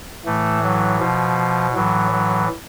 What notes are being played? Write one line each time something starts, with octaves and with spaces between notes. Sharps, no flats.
A2 E3 A3
F#3
B2 F3
A2 E3 F#3
F#3